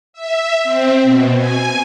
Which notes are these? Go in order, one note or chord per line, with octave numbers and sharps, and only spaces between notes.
E5
C4
B2
G#5